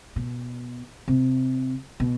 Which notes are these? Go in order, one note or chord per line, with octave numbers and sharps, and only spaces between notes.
B2
C3
B2